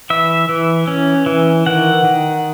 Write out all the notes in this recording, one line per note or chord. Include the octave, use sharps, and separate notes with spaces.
E3 E5
E3
C#4
E3
D#3 F#5
D#3